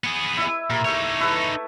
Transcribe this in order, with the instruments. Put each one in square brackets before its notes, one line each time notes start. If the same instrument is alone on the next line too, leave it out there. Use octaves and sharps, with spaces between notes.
[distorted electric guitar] B3 G#4
[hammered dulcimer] E4 E5
[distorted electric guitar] A#2 [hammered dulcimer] A#4
[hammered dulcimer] A3 [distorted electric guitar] D#4 C#5
[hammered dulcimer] E4 A4 B4